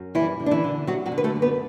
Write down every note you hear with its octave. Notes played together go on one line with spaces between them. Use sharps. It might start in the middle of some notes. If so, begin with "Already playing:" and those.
Already playing: F#2
E3 G3 E4
D3
D4
E3 E4
D3
F#3 G3 F#4
F#3 F#4
D3
B4
A3 A4
F#2
B3 B4